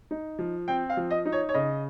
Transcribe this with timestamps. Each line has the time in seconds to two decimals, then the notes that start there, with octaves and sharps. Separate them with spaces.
0.11 D#4
0.39 F3
0.68 C4 G5
0.90 F5
0.97 F3
1.11 D#5
1.26 D#4
1.32 C#5
1.49 C#5
1.54 C#3 D#5